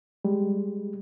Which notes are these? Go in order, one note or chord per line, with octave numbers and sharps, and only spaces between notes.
G3 G#3